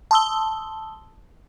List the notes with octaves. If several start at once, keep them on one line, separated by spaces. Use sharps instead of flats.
A5 C6 D#6 E6 G7